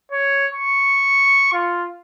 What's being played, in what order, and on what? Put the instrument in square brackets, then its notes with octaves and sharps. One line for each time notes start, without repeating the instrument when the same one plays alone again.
[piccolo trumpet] C#5
C#6
F4